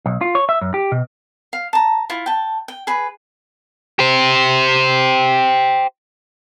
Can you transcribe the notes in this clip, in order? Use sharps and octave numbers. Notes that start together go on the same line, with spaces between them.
B1
F4
C#5
E5
F#2
G4
B2
F5
A5 A#5
E4 F4
G5 A5
G5
G#4 B4 B5
G4 C5